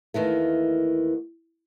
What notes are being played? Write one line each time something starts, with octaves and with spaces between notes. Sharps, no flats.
D#2 D#3 E3 A3